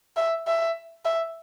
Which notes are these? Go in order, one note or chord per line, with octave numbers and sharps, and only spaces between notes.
E5
E5
E5